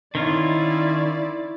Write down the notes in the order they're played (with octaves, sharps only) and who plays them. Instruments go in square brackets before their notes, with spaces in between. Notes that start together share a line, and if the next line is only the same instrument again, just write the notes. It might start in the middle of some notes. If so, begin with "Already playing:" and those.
[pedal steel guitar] D#3 C#4 F4 [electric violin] E4 D5